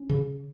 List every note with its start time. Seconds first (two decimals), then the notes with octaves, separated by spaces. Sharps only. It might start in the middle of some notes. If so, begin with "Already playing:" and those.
Already playing: C#4
0.09 C#3